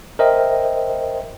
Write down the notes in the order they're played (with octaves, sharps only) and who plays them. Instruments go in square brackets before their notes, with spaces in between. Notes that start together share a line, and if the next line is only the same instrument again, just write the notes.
[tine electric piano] A#4 C5 D#5 E5 G5